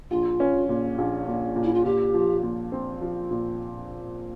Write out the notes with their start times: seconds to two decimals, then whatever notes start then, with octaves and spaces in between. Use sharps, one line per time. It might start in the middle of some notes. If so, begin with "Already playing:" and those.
0.11 A#1 F4
0.40 C#4
0.69 A#2
0.98 A#1
1.27 A#2
1.56 A#2
1.63 E4
1.74 F4
1.85 A#2 G4
2.14 F3
2.43 A#2
2.72 C4
3.01 F3
3.31 A#2